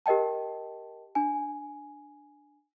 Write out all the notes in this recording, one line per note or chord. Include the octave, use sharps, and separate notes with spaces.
G4 A#4 D#5 G5 A5
D4 G#5